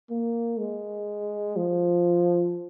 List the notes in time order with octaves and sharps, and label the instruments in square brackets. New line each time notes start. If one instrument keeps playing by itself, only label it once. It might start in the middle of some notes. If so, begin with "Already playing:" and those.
[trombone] A#3
G#3
F3